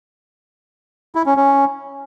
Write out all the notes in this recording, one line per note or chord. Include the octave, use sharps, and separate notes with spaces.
E4
C#4
C#4